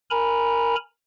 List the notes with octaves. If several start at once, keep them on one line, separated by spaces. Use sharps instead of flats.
A#4 G#5 A#5 B5